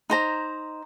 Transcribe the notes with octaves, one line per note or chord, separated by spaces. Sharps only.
D#4 C5 A#5